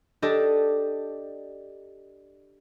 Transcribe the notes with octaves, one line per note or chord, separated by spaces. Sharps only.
D4 G4 A4 D5 D#5